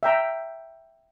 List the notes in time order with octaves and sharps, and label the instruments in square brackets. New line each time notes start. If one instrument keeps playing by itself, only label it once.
[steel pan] E5 G5 A#5